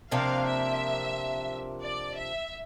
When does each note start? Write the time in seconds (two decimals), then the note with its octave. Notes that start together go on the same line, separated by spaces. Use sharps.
0.11 C3 F3 A#3 D4 F5
0.46 E5
1.83 D5
2.17 E5